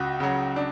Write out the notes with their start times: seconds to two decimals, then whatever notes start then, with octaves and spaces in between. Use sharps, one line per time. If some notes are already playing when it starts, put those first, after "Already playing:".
Already playing: C#2 F#4
0.20 C#3 F#3
0.56 D4